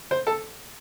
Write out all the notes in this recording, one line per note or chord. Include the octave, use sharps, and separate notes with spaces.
C5
A4